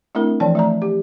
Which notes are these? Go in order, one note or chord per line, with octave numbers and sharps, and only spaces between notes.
A3 C4 D4 E4 A#4
E3 F3 C#5 D5 G5 A5
A3 D5 A#5
G4